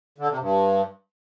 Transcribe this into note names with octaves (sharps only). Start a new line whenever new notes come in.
D3
C3
G2